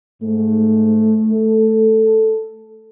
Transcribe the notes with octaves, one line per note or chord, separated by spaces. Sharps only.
G#2 A3
A4